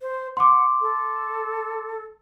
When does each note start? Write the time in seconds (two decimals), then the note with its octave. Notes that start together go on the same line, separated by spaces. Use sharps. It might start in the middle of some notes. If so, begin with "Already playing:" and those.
0.01 C5
0.37 F#5 C6 D6
0.81 A4